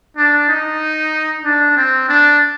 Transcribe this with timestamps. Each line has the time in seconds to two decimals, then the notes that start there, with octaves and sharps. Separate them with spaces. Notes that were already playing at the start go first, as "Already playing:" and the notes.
0.17 D4
0.49 D#4
1.44 D4
1.77 C4
2.09 D4